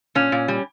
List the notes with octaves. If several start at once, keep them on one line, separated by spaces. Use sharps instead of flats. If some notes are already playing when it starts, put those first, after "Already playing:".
A#2 C#4
A#2
G3